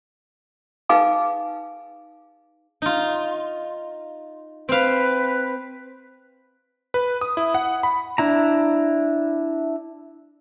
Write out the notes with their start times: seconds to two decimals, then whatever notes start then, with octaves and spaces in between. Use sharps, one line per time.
0.89 D#4 G#4 B4 F5 G#5 D6
2.82 D#4 F4
4.69 C4 B4 F5
6.94 B4
7.21 D#6
7.37 E4
7.55 F#5
7.83 B5
8.18 D4 E4 A#5